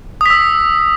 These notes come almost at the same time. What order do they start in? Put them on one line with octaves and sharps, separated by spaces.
D#6 B6 E6